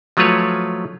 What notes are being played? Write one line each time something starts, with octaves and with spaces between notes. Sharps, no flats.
F3 F#3 A3 F4 B4 C#5